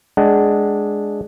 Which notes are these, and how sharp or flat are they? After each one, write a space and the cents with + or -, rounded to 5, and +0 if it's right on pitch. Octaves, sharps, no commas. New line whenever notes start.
G#3 +5 D4 +0 F#5 +30